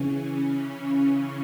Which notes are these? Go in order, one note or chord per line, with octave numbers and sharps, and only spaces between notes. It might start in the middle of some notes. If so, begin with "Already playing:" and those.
Already playing: C#3 E3 C#4